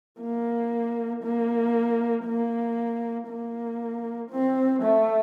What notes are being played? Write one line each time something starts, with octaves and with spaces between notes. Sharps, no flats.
A#3
A#3
A#3
A#3
C4
A3